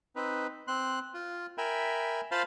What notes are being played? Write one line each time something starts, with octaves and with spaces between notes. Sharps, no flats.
C4 D#4 B4
C4 C6 F#6
F4
A#4 E5 G5 G#5 B5
F4 C5 F5 A5 B5 C6